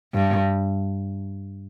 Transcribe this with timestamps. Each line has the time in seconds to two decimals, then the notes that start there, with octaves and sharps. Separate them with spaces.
0.14 G2